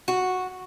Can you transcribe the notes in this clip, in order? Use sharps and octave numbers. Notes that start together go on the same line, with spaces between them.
F#4